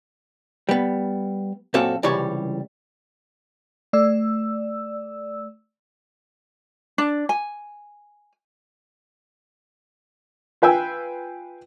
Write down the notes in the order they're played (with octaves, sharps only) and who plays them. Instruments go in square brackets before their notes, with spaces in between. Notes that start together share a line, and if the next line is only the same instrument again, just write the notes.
[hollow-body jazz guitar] G3 B3
F#2 A#2 C4 F#4 A4 F5
C#2 C3 E3 G3 C#5 D5
[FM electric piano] A3 D5 E6
[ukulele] D4
G#5
[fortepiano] F4 B4 G5 G#5 E6